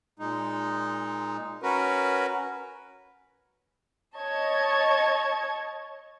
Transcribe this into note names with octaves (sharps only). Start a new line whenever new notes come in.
A#2 G#3 D#4
C#4 F#4 A#4 B4
C#5 D#5 A5 C#6 G#6